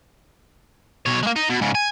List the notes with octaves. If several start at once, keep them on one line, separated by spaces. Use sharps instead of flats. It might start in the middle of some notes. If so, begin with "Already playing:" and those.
B2 C#5
G#3 A#3
D#4
B2
G#2 C#3
G#5